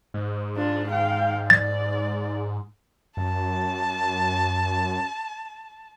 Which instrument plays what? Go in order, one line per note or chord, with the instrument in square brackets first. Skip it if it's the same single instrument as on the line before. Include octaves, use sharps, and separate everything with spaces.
[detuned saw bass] G#2
[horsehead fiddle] D4 F4
F5 G5
[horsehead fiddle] D5 [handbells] A6
[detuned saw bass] F#2 [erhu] A5